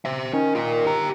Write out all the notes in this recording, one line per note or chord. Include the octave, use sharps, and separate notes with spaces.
C5 E5
D#3 C#4
F4 A#4
G4 A#5